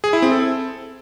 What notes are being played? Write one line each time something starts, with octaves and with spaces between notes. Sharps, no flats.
G#4
E4
C4
A4